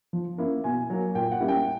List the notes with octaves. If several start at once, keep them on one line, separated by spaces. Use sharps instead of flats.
F3
A#3 C#4 E4
B2 G#5
F#3 A#3
A#2 G5
F#5
G3 A#3 C#4 E4
G5